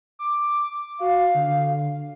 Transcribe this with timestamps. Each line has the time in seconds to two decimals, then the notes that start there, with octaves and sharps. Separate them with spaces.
0.19 D6
1.00 F#4 F5
1.35 D3